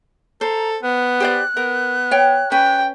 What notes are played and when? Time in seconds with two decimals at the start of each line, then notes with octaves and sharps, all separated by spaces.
0.41 A4 C5 A#5
0.83 B3 F#6
1.20 G4 C5 D5
1.57 B3 A#4
2.11 C#5 G5
2.52 C#4 B4 G5